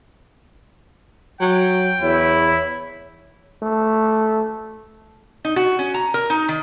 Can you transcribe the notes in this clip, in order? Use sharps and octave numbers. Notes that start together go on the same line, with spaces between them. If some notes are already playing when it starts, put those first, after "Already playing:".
F#3 G5
E2 E4 C#5
A3
D#4
F#4
C#4
A#5
A#4
D#4
D#3